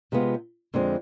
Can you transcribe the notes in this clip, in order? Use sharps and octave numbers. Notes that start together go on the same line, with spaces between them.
C3 G#3 B3 F4
F2 D3 G#3 C4